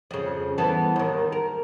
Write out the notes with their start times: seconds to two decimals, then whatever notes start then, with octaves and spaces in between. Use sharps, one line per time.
0.11 F2 C#3
0.58 E3 B3 A4
0.96 D#2 D#3
1.32 A#4